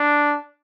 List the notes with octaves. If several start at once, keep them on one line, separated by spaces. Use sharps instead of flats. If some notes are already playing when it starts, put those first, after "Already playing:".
Already playing: D4